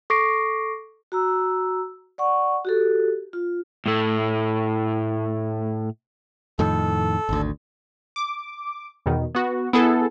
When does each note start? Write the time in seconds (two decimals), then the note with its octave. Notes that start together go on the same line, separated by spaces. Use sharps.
0.10 A4 C#6 D6 A#6 C7 D7
1.12 F#4 A#5 E6
2.18 D5 F#5 C#6
2.65 F#4 G4 A4
3.33 F4
3.86 A2 A3
6.59 F2 A2 D#3 A4
7.29 G#1 D2
8.16 D6
9.06 E2 B2 D#3
9.35 B3 F#4
9.73 B3 E4 G#4 A4